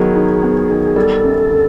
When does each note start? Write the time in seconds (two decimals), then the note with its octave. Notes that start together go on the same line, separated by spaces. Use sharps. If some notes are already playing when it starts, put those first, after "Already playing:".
Already playing: D#3 F#3 B3 G#4
0.16 D#4
0.43 B3
0.70 D#3
0.96 G3 A4
1.24 F#2
1.50 D3